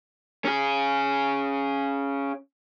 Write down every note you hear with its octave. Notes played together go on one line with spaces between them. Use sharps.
C#4 G#4